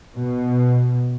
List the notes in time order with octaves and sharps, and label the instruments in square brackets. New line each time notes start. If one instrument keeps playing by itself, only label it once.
[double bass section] B2